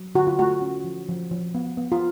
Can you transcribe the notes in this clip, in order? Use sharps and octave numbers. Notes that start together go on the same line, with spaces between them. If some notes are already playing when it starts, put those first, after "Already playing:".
Already playing: F#3
D3 F#4
F4
A3 F#4
C#4
F3
F3
F3
B3
B3
F4